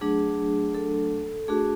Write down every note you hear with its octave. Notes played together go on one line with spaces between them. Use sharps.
F#3 A3 D4 G#4
A4
A3 D4 F#4 G#4